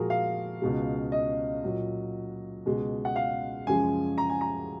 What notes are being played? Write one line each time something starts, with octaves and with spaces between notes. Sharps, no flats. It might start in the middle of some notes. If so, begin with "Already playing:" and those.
Already playing: A#2 F3 G#3 F#4 G#4 A#4
F5
C#2 B2 G#3
D#5
A#2 F#3
C#2 B2 G#3
F#5
F5
F#2 C#3 F3 G#3 G#5
A#5
G#5
A#5